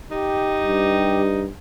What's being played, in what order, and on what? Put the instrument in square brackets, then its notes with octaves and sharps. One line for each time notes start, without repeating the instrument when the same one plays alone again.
[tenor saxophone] D#4 [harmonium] G4
[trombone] G2